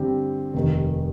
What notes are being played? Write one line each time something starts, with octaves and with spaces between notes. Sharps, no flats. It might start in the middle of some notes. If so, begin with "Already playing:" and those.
Already playing: G2 D3 G3 C4 G4
F1 D#2 D#3